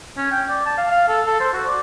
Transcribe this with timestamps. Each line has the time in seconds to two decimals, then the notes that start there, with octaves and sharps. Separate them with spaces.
0.17 C#4
0.32 G5
0.49 D5
0.66 A5
0.78 F5
0.91 F5
1.09 A4
1.26 A4
1.40 C5
1.53 F#4
1.68 D5